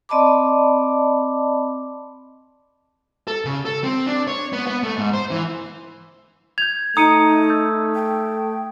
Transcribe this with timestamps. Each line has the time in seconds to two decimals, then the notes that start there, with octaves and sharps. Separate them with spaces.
0.09 C4 D5 D#5 A5 B5 D6
3.28 A4
3.45 C#3
3.65 A4
3.84 C4
4.07 D4
4.28 C#5
4.53 B3
4.67 B3
4.83 A3
4.96 G#2
5.13 C5
5.31 E3
6.58 G6 G#6 F7
6.97 A3 D#4 A#5 D#6 C#7 D#7
7.50 E6 G6 A6
7.95 G5